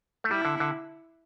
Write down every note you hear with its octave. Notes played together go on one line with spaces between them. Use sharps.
A3
G3 E4
D3
D3